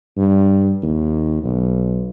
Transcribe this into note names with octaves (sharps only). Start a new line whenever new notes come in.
G2
D#2
B1